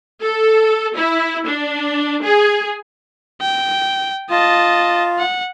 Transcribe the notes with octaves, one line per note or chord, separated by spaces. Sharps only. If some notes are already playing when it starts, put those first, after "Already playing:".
A4
E4
D4
G#4
G5
F4 D#5 A5
F#5